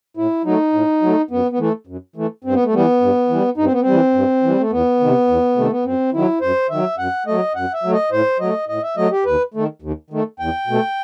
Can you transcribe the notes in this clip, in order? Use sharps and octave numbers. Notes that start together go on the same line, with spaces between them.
A2 E4
F#3 A3 D#4
A2
F#3 A3
F#2 B3
B3
E3 A3
F#2
E3 A3
G2 C4
B3
A3
E3 G3 B3
G2
E3 G3
G2 D#4
C4
B3
C4
E3 G3
G2
E3 G3
A3
E2 B3
C3 D#3
E2
C3 D#3 A3
B3
F#2 C4
D#3 F#3 E4
F#2 C5
D#3 F#3 E5
F#2 F#5
F#3 A3 D#5
F#2 F#5
E5
F#3 A3
D#5
A2 C5
F#3 A3 D#5
A2 D#5
E5
F#3 A3 D#5
G4
D#2 B4
D#3 A3
D#2
D#3 A3
E2 G5
B2 A3